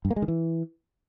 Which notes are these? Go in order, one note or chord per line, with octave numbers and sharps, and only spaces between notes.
G2
A#3
G#3
D#3
E3